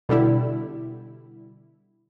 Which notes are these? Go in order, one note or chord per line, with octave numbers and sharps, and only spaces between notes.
B2 D3 G3 E4